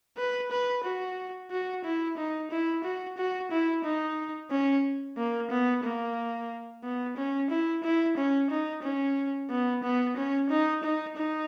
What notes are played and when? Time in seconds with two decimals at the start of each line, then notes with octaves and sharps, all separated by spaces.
0.18 B4
0.51 B4
0.84 F#4
1.51 F#4
1.84 E4
2.17 D#4
2.51 E4
2.84 F#4
3.17 F#4
3.51 E4
3.84 D#4
4.51 C#4
5.17 A#3
5.50 B3
5.84 A#3
6.83 B3
7.17 C#4
7.50 E4
7.83 E4
8.17 C#4
8.50 D#4
8.83 C#4
9.50 B3
9.83 B3
10.16 C#4
10.50 D#4
10.83 D#4
11.17 D#4